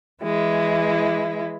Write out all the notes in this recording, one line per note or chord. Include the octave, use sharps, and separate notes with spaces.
E3 G#3 E4